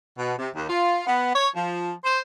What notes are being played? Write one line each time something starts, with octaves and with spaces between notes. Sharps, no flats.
B2
C3
D#2
F4
B3
C#5
F3
C5